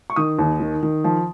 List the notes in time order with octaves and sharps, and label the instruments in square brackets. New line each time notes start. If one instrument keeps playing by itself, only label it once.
[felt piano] C#6
D#3 D#6
D#2
D#3
D#3
F3